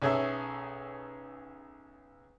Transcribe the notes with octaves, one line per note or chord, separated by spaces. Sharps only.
B1 C#4 G#4 A4 E5